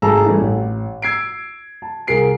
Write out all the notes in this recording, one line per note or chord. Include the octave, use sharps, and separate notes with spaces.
G#1 A3 G#4 A5 A#5 E6
E3 G3 A3 C#4 E4
A1
E6 G#6 C7 D7
A5
C2 G#4 A#4 C7 D7